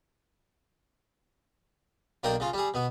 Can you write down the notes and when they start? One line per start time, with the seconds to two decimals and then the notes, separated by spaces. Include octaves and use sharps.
2.23 B1 A#3 D4 A#4 G5
2.40 C#3 F4
2.54 G3 G#4
2.74 B2 B3